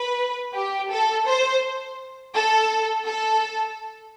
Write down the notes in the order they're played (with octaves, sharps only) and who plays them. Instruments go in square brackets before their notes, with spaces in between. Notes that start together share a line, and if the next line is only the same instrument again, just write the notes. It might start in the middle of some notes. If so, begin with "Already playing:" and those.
Already playing: [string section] B4
G4
A4
C5
A4
A4